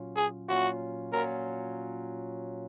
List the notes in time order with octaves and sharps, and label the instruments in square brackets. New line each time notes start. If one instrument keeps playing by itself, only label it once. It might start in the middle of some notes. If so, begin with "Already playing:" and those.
Already playing: [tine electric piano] A#2 F#3 C#4 F4
[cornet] G#4
[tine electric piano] A#2 F#3 C#4 F4 [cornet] F#4
[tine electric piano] A#2 F#3 C#4 F4 [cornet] A#4